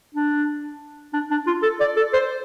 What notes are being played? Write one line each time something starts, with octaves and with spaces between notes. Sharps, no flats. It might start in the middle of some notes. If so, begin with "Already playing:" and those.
D4
D4
D4
F4
A4
D5
A4
C5